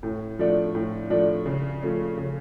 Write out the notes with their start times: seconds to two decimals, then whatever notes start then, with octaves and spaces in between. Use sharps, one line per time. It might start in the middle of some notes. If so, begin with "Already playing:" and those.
0.03 A2
0.39 F3 A3 D4
0.75 A2
1.10 F3 A3 D4
1.46 C#3
1.82 F3 A3 C#4
2.17 C#3